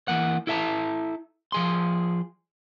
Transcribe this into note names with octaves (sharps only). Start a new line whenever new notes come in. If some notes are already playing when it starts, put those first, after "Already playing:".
E3 G#3 A#3 F#5
E4 A4 E5 A5 A#5
F3 G#4 C6